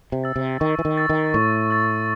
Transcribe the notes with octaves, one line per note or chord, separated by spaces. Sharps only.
C3
E6 A6
C3
D#3 C#6
E3
D#3
E6 A6
D#3
A2 C#6
E6 A6